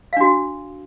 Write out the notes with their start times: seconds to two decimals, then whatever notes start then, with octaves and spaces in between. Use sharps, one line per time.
0.13 F5
0.17 D4
0.21 F#4